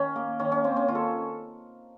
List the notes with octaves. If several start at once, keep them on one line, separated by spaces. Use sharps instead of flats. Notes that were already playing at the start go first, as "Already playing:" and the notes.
Already playing: D#3 C#4
A#3
D#3 C#4
C#4
A#3 C4
C#4
D#3 F4
A4